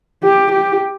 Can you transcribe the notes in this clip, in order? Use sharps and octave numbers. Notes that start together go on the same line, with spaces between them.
G4
G4